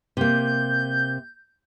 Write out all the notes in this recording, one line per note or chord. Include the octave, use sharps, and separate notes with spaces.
C3 A#3 G6